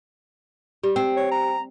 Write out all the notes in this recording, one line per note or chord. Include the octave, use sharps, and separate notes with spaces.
G3 G4
C4
C#5
A#5